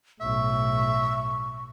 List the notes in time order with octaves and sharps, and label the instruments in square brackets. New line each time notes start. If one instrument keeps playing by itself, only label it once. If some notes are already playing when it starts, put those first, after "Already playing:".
[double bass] B1 A2 [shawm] E5 [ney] C#6